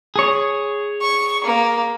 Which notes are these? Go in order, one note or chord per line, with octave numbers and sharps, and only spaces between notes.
G#4 C#5
C#6
A#3